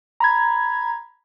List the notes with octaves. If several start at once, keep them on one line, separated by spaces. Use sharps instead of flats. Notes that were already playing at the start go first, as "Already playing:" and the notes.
A#5 B5 G#6